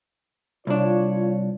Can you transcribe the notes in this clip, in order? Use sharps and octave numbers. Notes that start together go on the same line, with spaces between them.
C2 D4 F4 C#5